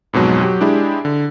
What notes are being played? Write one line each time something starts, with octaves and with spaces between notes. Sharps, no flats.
F2 G#2 B2 F#3 G#3
F#3 G4
G#3 D4 E4 G4 G#4
D3